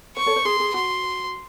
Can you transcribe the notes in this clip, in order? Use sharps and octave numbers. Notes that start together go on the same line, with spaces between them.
C5 C#6
A4 C#5
C5
G#4 C6
G#4
F#4 C6